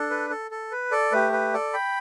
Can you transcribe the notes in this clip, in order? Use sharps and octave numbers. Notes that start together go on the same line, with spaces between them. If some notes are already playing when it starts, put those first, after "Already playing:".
Already playing: D4 A4
B4
A4
A4
B4
A4 D5
A3 G4 B4
B4
A4 D5
G5 B5